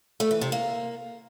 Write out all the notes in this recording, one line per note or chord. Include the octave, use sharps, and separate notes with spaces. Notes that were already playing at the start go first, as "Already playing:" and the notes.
A3
E3
C3
A#3